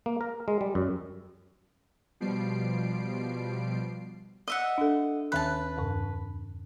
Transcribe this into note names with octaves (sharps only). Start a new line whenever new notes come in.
A#3
A#4
G#3
G3
F#2
B2 F3 G3 C7 D7
D#5 E5 F#5
D4 A4
D#2 D#3 B4 A5 F#6
E2 G2 C3